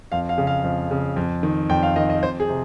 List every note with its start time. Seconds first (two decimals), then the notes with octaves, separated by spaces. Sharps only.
0.12 F2 F5
0.29 F5
0.38 C#3
0.47 F5
0.64 F2
0.91 C#3
1.16 F2
1.43 D#3
1.69 F2 G5
1.83 F5
1.96 D#3 D#5
2.10 D#5
2.23 F2 C5
2.40 G#4
2.49 C3